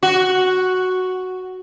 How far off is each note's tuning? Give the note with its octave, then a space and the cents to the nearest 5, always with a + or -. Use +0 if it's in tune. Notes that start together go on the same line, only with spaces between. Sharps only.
F#4 +0